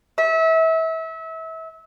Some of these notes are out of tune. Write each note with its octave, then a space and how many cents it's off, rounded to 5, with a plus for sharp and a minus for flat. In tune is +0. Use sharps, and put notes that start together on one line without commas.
E5 -30